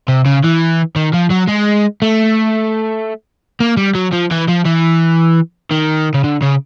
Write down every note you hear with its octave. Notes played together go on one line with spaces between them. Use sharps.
C3
C#3
E3
D#3
F3
F#3
G#3
A3
A#3
G3
F#3
F3
E3
F3
E3
D#3
C#3
D3
C#3